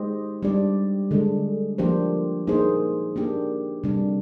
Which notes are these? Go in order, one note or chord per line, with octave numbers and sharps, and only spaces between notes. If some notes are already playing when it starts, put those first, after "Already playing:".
Already playing: G#3 D#4 G4 C5 D#5
G3 D4 G4 D5
D3 G#3 D4
F3 A#3 D4 G4 C5
A#3 D#4 G#4 C5
A#3 D4 G4
C3 G3 D4